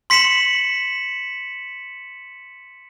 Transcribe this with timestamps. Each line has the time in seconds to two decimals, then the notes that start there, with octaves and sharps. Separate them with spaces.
0.10 C6 B6 C#7 E7 F#7